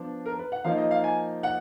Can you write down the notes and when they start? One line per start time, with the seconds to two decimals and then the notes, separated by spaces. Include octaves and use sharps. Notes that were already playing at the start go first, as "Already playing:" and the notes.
Already playing: F3 B3 D4
0.26 A#4
0.39 B4
0.52 F#5
0.64 F3 A#3 D#4 F5
0.78 D#5
0.91 F5
1.04 G#5
1.43 F#5